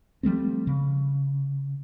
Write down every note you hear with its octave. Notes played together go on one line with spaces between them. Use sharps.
F3 G3 A3 C4
C#3